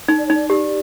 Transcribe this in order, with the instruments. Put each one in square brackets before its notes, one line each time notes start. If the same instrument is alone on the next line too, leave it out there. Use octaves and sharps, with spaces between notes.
[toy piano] D#4
[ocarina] D5
C#5
[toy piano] D#4 [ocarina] D5
[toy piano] G4 [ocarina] D5